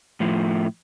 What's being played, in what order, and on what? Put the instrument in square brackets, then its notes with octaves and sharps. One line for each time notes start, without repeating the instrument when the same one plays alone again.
[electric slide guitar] A2 F3